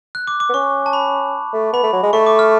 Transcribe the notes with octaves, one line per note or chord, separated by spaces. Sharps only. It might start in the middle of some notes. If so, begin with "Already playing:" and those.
F#6
D6
D6
B3
C#4 C#6
A5
B5
A3
B3 B5
A3
F#3
G#3
A3 C#6
D6
F6